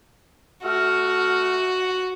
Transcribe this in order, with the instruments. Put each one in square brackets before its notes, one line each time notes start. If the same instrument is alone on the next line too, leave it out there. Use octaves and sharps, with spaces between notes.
[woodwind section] A3 F6 [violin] F#4